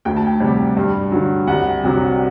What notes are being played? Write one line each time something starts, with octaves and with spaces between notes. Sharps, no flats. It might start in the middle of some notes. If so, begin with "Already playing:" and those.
D2 G5
A5
G5
C3 G3
G2
D3 F#3
C2 F#5
C3 F#3